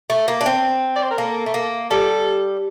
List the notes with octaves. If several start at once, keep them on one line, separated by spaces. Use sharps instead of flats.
A3
A#3
D4
C4
D5
C5
A#4
A#3 A4
A3
A#3
G3 A4